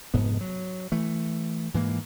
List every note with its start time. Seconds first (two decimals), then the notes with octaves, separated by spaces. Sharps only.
0.14 F1 G#2 B3
0.41 F#3
0.92 E3 A3
1.74 G#2 E3 A#3